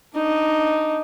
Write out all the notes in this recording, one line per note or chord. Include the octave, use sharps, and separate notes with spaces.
D4 D#4